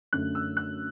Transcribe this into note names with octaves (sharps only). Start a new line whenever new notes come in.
F#2 D3 A3 C#4 F#6
E6
F#6